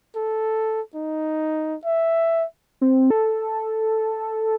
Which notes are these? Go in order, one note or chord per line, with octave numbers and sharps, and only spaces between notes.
A4
D#4
E5
C4
A4